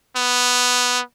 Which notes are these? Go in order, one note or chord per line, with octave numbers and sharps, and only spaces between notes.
B3